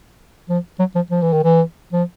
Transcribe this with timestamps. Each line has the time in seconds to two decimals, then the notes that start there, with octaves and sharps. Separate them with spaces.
0.49 F3
0.79 F#3
0.95 F3
1.11 F3
1.22 E3
1.33 D#3
1.44 E3
1.93 F3